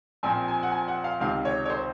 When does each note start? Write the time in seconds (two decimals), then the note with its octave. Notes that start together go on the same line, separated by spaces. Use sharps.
0.23 A#1 A#2 F3 C4 G#5
0.48 G#5
0.63 F#5
0.72 G#5
0.88 F#5
1.04 F5
1.20 C#2 C3 D#3 F5
1.45 C#5
1.66 C#5
1.70 C5